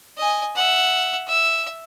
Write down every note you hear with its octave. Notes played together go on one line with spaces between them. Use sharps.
D#5 G#5
E5 F#5
E5 E6